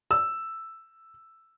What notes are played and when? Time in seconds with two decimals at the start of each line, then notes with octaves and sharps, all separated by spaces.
0.11 E6